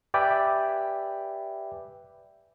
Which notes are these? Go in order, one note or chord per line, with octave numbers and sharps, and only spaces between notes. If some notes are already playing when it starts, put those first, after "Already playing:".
G4 B4 D5 E5 G5 G#5